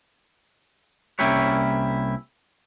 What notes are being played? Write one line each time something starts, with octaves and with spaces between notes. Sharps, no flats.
C2 A#3 C#4 E4 G4 C#5